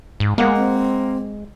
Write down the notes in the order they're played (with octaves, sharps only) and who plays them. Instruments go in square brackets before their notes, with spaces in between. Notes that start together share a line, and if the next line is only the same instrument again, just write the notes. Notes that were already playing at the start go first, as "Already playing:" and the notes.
[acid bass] G#2
[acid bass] G#3 [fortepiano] A#3 F#5
[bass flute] C4